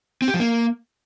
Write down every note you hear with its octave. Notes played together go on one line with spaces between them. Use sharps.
C4
G4
F3
A#3